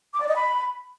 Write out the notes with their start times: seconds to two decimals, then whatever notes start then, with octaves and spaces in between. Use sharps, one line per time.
0.15 D6
0.22 D5
0.29 D#5
0.36 B5